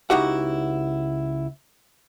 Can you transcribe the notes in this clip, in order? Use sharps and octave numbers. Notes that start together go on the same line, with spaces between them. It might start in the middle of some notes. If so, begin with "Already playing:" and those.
C#2 D#4 E4 F#4 G4 F#5